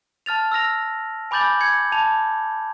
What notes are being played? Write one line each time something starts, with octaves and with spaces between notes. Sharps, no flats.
A5 F6 A6 F7
E6 F6 A#6 F7
G#5 B5 D6 G6 A6 F#7
G#6 C#7
A5 F7